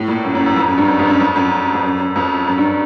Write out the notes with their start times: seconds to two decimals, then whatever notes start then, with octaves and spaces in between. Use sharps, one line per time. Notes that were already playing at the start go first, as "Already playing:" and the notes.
Already playing: A2
0.08 A#2
0.24 F#2
0.35 F#2
0.46 F#2
0.56 F2
0.67 F#2
0.78 G2
0.88 F#2
0.99 F2
1.09 F#2
1.20 F2
1.36 F#2
1.74 F2
1.83 F#2
2.00 F#2
2.16 F2
2.47 F#2
2.58 G2